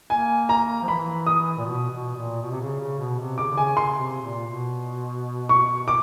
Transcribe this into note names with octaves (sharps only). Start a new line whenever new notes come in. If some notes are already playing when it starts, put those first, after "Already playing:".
A#3 G#5
A#5
F3
E3 B5
D#6
A#2
B2
B2
A#2
B2
C3
C#3
C#3
B2
C3
C#3 D6
D3
C#3 G#5
C#3 C6
C3
A#2
B2
C#6
D6